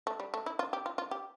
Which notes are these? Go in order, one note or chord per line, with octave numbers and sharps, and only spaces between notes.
A3
G3
A3
E4
F4
G4
F4
F4
G4